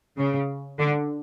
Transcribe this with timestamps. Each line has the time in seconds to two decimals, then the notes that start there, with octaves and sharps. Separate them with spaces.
0.18 C#3
0.79 D3